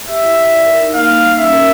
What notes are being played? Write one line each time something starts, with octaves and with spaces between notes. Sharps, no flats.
G4 E5
E4
E4
D5
A#4
D#4
A#3 F5
G3
G3
C#4 E5
A#4